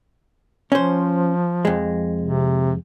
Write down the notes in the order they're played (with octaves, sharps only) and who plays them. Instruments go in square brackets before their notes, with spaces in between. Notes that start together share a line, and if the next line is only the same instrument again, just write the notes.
[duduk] F3 [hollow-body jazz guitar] C#4 C5
[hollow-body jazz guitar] F2 G#3
[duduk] C3